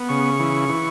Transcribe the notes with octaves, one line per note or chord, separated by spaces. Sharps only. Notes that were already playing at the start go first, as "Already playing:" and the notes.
Already playing: B3
C#3 C#6
E3
E3